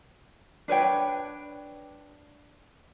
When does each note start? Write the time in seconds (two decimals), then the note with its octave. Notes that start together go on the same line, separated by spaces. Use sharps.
0.68 D4 B4 C#5 G5